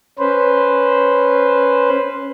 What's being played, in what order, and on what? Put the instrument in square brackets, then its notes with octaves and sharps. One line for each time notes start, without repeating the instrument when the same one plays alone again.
[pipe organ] C#4 B4 C5